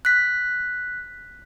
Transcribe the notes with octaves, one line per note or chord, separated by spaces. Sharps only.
F#6 B6